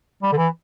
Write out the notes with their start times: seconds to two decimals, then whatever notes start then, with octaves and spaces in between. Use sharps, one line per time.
0.22 G3
0.32 D3
0.37 E3